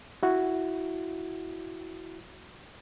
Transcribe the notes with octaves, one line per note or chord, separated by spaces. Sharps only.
E4 F#4